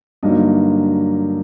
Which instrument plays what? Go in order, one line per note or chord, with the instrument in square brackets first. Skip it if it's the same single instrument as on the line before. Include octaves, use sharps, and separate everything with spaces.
[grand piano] G2 D3 F#3 A#3 D#4